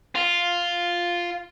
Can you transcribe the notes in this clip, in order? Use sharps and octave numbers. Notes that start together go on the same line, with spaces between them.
F4